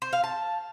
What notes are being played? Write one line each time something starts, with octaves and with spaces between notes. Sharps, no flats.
C5
F5
A5